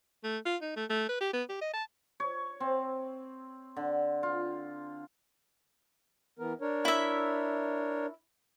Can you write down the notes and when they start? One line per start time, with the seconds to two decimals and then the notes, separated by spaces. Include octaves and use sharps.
0.24 A3
0.46 F4
0.62 D#4
0.76 A3
0.90 A3
1.09 B4
1.20 G4
1.33 B3
1.49 G4
1.61 D#5
1.74 A5
2.20 C#5
2.60 C4
3.77 D3
4.23 F4
6.39 E3 B3 A#4
6.61 D4 A#4 C#5
6.85 E4 E5